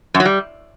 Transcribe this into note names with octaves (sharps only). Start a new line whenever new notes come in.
F#2
F#3
G3